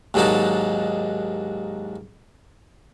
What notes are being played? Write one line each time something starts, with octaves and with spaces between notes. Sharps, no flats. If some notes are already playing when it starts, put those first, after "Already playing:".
D#2 G#2 F#3 D4 D#4 A5